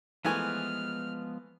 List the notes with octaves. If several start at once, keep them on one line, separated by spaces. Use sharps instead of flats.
E3 F3 G#3 A3 B3 G#5 F6